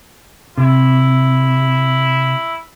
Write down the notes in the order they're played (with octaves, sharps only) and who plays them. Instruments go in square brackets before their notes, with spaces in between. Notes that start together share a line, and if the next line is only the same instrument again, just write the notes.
[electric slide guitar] C3 [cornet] E4